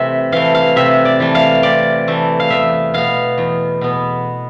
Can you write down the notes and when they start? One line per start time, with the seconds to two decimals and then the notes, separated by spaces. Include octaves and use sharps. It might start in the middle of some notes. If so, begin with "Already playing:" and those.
Already playing: C3 E3 A3 E5
0.32 E3 A3 F5
0.54 F5
0.76 C3 E5
1.05 D5
1.20 E3 A3
1.35 F5
1.63 C3 D5
2.08 E3 A3
2.40 F5
2.50 E2 E5
2.94 B2 B3 F5
3.38 E2
3.81 B2 B3